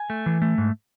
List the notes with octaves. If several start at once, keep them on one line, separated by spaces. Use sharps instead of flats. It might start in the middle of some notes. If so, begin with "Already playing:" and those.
Already playing: G#5
A3
E3
A3
G#2